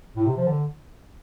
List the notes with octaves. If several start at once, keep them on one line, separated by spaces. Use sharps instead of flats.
A2
C3
F3
D3